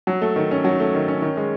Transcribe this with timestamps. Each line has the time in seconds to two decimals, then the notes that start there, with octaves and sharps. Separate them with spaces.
0.07 F#3
0.22 A3
0.36 D#3
0.51 C#4
0.65 F#3
0.80 A3
0.94 D#3
1.08 C#4
1.22 D#3
1.37 G#3